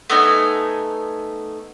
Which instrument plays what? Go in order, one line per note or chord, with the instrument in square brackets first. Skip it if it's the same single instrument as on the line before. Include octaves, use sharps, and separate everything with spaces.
[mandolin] A3 B3 D#4 G#5